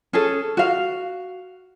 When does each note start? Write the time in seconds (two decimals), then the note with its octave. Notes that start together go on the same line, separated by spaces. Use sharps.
0.13 C#4 G#4 A4
0.57 F#4 F5